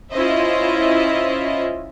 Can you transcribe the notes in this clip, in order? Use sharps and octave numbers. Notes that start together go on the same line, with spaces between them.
C#4 E4 F4 C5 D#5 E5